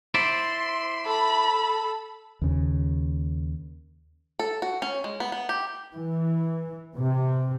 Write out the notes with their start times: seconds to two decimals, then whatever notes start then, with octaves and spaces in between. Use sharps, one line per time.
0.14 E4 C5 D5 C6
1.06 A4 B5
2.42 D#2 C#3
4.39 A4
4.62 F#4
4.82 C#4
5.04 G#3
5.20 B3
5.32 B3
5.49 G4
5.94 E3
6.96 C3